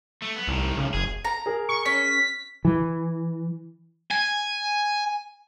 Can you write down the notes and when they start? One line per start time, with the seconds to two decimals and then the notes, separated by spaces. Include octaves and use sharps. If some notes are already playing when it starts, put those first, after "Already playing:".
0.22 A3
0.36 B3
0.47 C2 A2 D#3
0.77 C#3
0.94 F#1 G#4
1.25 A#5
1.46 G#4 A#4
1.69 C#6
1.86 C#4 B6
2.65 E3
4.11 G#5